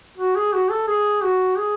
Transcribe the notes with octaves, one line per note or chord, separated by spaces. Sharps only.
F#4
G#4
F#4
A4
G#4
F#4
G#4